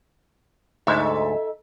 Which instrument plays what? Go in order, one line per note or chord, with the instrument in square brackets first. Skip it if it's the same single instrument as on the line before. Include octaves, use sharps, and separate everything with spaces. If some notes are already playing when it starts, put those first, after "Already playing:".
[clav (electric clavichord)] D2 G#2 [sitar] D#4 A4 E5